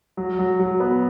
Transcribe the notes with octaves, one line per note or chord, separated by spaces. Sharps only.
F#3
F#3
F#3
B3